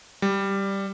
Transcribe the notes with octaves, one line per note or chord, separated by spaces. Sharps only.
G3